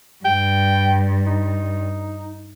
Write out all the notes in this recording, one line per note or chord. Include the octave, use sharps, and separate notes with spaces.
G2 G5
D#4